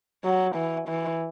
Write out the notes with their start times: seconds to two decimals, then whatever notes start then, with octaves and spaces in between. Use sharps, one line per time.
0.24 F#3
0.55 E3
0.88 E3